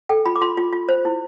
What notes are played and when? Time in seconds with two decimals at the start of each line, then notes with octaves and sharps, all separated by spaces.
0.09 A4 G5
0.25 F4 B5
0.36 D6
0.41 F4 C6
0.57 F4
0.73 F4
0.89 C5
1.05 E4